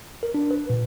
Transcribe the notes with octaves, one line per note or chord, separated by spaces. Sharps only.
A#4
D4
B4
A#2